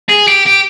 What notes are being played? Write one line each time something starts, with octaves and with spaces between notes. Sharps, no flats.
G#4
G4
G4